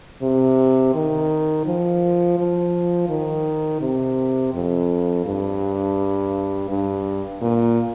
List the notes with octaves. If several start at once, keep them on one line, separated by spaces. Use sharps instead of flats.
C3
D#3
F3
F3
D#3
C3
F2
G2
G2
A#2